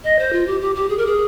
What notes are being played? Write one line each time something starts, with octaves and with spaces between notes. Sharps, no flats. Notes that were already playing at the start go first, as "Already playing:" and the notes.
D#5
C5
F4
G4
G4
G4
G#4
A#4
G#4